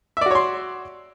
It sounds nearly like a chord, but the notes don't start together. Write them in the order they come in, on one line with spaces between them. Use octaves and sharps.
E5 D5 F#4 C#5 C6